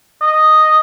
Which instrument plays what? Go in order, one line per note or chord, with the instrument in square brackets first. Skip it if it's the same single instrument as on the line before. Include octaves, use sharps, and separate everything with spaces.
[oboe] D#5